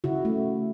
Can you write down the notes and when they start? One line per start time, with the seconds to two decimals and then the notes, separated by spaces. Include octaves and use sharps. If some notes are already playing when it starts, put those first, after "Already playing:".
0.04 C#3 E4 F#4
0.25 A3